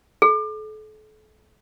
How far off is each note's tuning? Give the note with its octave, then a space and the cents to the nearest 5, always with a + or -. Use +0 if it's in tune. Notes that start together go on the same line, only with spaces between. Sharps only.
A4 -35